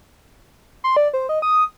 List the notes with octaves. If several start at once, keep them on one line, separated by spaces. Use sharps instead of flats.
C6
D5
C5
D#5
D#6